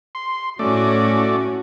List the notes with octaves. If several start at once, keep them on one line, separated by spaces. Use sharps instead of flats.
C6
A2 A3 C#4 F#4 D5